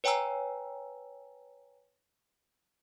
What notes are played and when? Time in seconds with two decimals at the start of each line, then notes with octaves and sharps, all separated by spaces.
0.04 B4 C#5 G5 G#5 A#5 E6